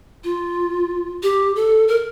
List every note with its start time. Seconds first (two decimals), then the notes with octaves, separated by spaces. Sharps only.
0.24 F4
1.23 G4
1.56 A4
1.88 A#4